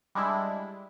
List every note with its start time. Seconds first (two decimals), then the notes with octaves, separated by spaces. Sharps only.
0.15 G3 G#3 D4 E4